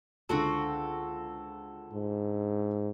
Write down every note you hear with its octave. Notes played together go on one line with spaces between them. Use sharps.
C#2 D3 C4 F#4 A4
G#2